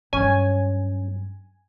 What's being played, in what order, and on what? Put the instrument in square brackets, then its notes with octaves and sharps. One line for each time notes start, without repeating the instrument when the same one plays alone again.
[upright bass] G2 F#3 [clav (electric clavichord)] C#4 [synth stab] G#5